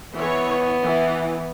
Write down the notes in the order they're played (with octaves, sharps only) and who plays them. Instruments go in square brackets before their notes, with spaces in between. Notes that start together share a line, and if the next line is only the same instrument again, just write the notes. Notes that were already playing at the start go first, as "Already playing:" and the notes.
[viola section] E3 C#5 [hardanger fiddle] B3
[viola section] E3